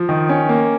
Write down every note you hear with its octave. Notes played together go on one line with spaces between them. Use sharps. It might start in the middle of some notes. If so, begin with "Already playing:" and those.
Already playing: F3
D#3
C#4
A#3